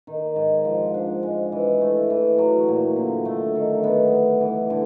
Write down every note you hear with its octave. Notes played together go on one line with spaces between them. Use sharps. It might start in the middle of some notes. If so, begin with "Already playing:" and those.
D#3
G#2
F3
D4
G#3
E3
A3
E3
F#3
A#2
D3
A3
D#3
B3
G3
E3
D3